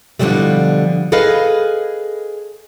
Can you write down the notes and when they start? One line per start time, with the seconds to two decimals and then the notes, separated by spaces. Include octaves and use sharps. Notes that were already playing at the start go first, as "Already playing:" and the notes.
0.19 B2 D3 E3 F3 G3 A3
1.12 G#4 A4 B4 D#5 F5